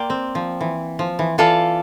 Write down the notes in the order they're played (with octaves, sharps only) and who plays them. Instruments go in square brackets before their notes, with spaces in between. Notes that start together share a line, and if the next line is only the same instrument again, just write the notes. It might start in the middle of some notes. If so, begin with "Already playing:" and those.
Already playing: [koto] A#3 [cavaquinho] D5 G5 C6
[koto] C4
F3
E3
F3
E3
[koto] E3 [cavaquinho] F4 A4 D5 F5